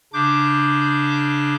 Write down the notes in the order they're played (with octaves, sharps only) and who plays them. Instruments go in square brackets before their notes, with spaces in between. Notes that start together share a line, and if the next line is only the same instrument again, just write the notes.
[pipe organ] C#3 D4 D6 G6